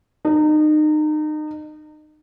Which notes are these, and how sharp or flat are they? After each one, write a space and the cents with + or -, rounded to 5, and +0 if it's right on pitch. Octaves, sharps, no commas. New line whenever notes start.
D#4 -30